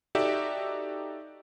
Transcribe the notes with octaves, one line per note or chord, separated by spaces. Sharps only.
D#4 F#4 G4 A4 D5 E5